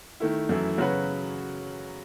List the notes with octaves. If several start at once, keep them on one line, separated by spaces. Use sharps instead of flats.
D#3 A3 E4
F#2 E3 A3 E4
C#3 F#3 C#4 F#4 B4